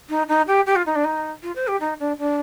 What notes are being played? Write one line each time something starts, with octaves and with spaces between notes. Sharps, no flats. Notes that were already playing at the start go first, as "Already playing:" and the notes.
D#4
D#4
G4
G4
F4
D#4
D4
D#4
F4
C5
G4
D#4
D4
D4